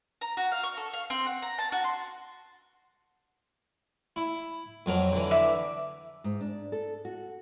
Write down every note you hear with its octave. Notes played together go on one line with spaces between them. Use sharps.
A#5
F#4
F5
C#6
A4
F5
C4
F#5
A#5
A5
F#4
C6
E4
F2 F#3 A#4
D3 E3
E5 D6
G#2
D4
A4
F#4